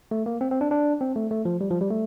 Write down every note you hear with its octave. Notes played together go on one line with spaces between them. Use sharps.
A3
A#3
C4
C4
D4
D4
C4
A3
A3
F3
G3
F3
G3
A3